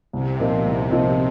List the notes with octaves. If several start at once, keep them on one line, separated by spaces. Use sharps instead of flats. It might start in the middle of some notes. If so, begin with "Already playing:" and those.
C2 C3
A#2 F3 C4 D#4
C2
A#2 F3 C4 D#4